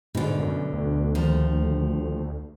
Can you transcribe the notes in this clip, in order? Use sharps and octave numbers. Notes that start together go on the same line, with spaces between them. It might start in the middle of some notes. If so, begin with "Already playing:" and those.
G#2 B2 D3
F#2
D2
D#2 F3 A3